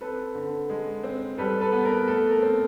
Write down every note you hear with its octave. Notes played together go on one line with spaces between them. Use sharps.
C4 A4 B4
D3
G#3
C4
G3 A4 B4
A4 B4
B3
A#4
A3 A4
A#4
C4